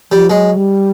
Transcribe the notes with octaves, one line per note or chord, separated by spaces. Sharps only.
F3 G3
F#3 G#3
G3